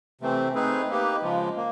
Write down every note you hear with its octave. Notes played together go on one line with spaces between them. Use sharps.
C3 E3 A3 C4
A3 C4 D#4 G#4 B4
A#3 D#4 G4 B4
C#3 F3 G#3
A#3